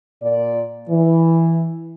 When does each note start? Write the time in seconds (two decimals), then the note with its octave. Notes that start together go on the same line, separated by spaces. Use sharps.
0.23 A#2 D5
0.89 E3